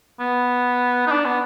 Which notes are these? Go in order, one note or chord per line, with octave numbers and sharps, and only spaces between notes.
B3
D#4
D4
B3